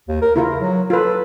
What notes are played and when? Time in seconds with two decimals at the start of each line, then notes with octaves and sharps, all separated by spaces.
0.08 D#2
0.22 A#4
0.36 C#3 E4 F4 A#4
0.60 F#3
0.90 F4 A4 B4